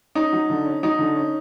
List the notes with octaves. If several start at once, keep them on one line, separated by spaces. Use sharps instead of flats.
C#4 D#4
F#3
D3
C#4
F#3 D#4
D3
C#4